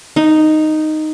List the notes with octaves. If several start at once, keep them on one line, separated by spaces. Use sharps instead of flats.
D#4